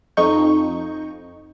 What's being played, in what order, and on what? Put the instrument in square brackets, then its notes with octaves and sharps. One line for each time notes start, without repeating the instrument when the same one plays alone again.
[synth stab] F2 D#4 C#6 G6